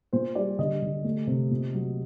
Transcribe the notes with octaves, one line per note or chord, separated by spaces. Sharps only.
A#2 C5
G3 D5
D3 D#5
D3
A3
C3
A#2
F#3